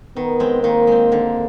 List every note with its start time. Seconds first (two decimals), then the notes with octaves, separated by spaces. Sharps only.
0.17 D#3 B3
0.40 G#3 C4
0.64 D#3 A#3
0.87 G#3 C4
1.12 D3